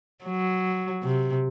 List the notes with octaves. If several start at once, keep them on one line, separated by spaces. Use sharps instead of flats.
F#3
C3